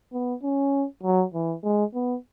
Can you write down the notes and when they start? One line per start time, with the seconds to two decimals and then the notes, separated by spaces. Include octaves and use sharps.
0.13 B3
0.43 C#4
1.03 F#3
1.34 E3
1.64 G#3
1.94 B3